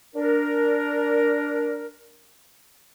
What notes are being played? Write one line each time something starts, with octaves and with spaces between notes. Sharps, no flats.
D4 A#4